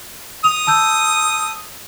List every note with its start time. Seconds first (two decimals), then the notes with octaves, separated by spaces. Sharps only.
0.44 D#6 F7
0.67 A5 E6 G6